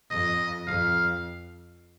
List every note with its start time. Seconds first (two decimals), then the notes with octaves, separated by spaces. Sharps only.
0.11 F2 D#5
0.67 F2 F5